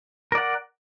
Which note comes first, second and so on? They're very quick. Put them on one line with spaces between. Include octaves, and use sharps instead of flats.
A#4 D5 F#5